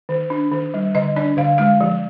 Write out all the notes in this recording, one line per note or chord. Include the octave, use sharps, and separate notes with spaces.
D#3
D4
D#3
G3
D3 D#5
D4 D5
D3 F5
G#3 F5
F3